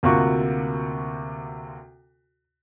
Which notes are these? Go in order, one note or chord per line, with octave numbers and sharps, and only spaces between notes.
D2 C3 A#3 F4 F#4 C#6